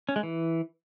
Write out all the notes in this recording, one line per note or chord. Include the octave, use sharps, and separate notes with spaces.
C#4
G#3
E3